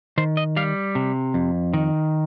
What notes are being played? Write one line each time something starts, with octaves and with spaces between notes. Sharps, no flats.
D#3 C5
D#5
G3 F5
C3
F2
D#3